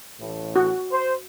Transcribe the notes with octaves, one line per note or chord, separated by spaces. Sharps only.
A1 A2
F#4
C5